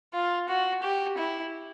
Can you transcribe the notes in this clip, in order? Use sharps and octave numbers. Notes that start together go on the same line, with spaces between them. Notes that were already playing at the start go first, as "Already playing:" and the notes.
F4
F#4
G4
E4